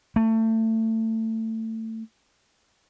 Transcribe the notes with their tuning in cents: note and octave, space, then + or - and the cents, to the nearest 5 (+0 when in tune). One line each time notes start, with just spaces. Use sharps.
A3 +25